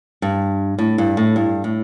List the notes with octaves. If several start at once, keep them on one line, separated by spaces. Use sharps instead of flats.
G2
A2
G2
A2
G2
A2